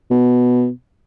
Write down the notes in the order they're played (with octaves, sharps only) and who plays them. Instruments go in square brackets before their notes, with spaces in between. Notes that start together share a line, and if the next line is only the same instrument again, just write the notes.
[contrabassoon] B2